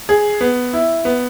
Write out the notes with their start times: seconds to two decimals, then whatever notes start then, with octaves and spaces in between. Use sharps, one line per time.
0.09 G#4
0.41 B3
0.73 E4
1.05 B3